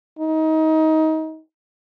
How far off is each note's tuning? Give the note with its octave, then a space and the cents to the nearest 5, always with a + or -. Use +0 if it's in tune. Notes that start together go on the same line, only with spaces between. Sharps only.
D#4 +25